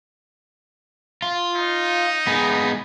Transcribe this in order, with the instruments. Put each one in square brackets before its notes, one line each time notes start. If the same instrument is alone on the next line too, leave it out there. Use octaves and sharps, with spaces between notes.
[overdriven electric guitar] F4
[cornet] D#4
[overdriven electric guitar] G#3 B3